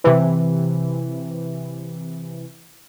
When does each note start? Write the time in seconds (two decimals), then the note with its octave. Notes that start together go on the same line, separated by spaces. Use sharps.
0.04 C3 E3